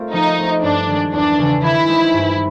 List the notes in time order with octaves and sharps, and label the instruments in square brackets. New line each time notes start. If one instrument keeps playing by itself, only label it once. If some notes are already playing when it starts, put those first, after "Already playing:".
Already playing: [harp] A3 C4 F4 A#4
[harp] F3 [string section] D#4
[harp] A3 C4
[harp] G2 [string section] D4
[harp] D#3 G#3
[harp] E2 [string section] D4
[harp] C#3 E3
[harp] D#3 [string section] E4
[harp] G#3 C4 D#4
G2